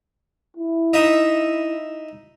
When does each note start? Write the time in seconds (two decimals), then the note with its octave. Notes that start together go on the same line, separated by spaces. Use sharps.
0.57 E4
0.93 D#4 D#5 E5